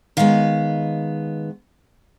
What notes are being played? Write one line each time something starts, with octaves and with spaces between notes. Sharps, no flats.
D#3 G#3 B3 F5